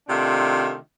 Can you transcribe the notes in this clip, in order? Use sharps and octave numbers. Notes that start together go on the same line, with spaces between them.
C3 D#3 A3 D4 F4